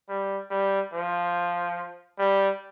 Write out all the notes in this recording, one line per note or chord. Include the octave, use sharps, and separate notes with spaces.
G3
G3
F3
G3